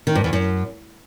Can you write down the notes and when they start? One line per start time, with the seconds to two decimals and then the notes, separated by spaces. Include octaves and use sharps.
0.07 D#3
0.15 G2
0.24 E2
0.33 F#2